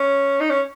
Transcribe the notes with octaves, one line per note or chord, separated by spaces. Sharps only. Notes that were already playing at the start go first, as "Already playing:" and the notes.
Already playing: C#4
D#4
C#4